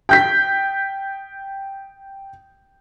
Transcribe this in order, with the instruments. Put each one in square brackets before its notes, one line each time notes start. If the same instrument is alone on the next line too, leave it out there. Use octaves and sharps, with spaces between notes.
[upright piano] G5 G6 B6